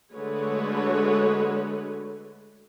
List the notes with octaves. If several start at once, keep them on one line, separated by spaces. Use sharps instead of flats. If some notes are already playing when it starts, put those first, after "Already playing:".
D3 G#3 A3 F#4 B4 C#5